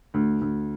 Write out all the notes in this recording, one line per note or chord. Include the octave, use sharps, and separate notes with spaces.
D2
D2